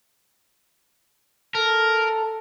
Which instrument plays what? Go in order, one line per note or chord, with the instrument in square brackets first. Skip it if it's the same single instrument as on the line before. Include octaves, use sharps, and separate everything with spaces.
[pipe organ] A4 [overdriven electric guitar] A#4